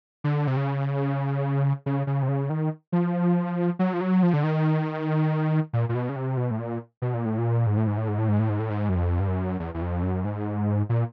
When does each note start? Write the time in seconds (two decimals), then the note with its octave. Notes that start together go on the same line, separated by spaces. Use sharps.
0.24 D3
0.47 C3
0.57 C#3
1.86 C#3
2.07 C#3
2.23 C3
2.28 C#3
2.50 D#3
2.92 F3
3.79 F#3
3.93 F3
4.01 F#3
4.23 F3
4.33 D3
4.44 D#3
5.73 A#2
5.89 A#2
5.95 B2
6.09 C#3
6.16 C3
6.37 B2
6.51 A2
6.59 A#2
7.02 B2
7.14 A#2
7.25 A2
7.38 A#2
7.67 G#2
7.77 A2
7.87 G#2
7.98 A2
8.08 G#2
8.18 A2
8.28 G#2
8.39 A2
8.49 G#2
8.59 A2
8.70 G#2
8.89 F#2
8.95 F2
9.20 G2
9.28 F#2
9.60 E2
9.74 E2
9.81 F2
10.03 F#2
10.24 G#2
10.89 A#2